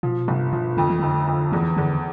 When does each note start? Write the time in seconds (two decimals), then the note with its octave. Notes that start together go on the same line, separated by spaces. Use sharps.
0.03 B2 F3
0.28 G1 C3
0.53 B2 F3
0.77 F2 D3
0.89 E3
0.99 F1 D3
1.27 F2
1.52 E2 E3
1.77 E2 D3